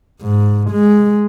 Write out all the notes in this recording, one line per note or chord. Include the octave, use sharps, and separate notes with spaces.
G#2
G#3